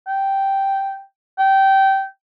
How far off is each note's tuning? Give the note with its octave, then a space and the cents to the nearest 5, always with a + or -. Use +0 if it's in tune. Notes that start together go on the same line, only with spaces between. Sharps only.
G5 -5
G5 -20